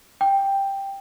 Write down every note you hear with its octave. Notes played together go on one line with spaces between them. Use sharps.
G5